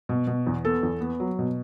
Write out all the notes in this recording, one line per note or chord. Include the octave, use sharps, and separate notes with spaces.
B2
B2
E2
B3 A4
E2
B3
F#3
B2